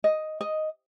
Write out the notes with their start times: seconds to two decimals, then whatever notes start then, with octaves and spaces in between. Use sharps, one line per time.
0.04 D#5
0.41 D#5